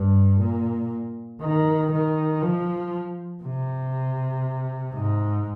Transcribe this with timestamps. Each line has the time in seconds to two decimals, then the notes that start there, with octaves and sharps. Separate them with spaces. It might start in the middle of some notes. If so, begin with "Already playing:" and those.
Already playing: G2
0.41 A#2
1.41 D#3
1.92 D#3
2.42 F3
3.43 C3
4.94 G#2